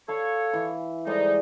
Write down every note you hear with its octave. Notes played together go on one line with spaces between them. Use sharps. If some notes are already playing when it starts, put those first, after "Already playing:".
A4 C#5 F5 B5
E3
F2 G3 G#3 D#4 D5